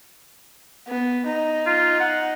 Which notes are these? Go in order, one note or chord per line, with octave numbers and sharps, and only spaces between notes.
B3
D#4
F4
F#5